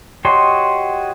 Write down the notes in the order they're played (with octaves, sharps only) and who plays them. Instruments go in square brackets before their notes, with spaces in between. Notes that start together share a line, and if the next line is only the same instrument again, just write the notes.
[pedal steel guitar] F#4 G4 C#5 D#5 C6